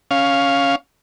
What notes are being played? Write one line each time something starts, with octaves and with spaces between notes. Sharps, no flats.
C#4 F5